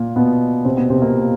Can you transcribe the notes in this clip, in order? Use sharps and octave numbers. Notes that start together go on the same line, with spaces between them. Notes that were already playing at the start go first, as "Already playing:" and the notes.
Already playing: A#2 A#3
B2 B3
C3 C4
B2 B3
C3 C4
A#2 A#3